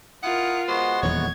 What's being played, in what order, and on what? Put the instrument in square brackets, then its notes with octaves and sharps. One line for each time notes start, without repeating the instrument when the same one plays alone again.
[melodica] E4 D#6 [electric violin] F4 A#4 [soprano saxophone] F#5
[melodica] G#3 B3 F#4 [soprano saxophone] C5
[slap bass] D#1 E2 F#3 [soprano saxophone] C#5 [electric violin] G#6